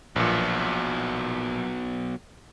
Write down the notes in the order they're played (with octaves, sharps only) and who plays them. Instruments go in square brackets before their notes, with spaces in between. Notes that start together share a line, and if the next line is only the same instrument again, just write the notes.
[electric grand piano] A#1 A#2 [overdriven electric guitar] F#3 B3